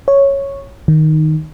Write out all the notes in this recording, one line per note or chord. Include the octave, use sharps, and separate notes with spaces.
C#5
D#3